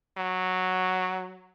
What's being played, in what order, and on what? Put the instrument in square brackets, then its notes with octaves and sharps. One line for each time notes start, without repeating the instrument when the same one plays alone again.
[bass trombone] F#3